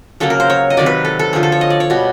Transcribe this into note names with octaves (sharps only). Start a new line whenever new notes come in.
C#3 F#3 A#3 A4
A#4
C5
C#5
D#5
C3 D#3 F#3 D5
B4
A4
A4
D3 F3 A3 G#4
A4
C#5
D#5
D5
C#5
B2 G3 B3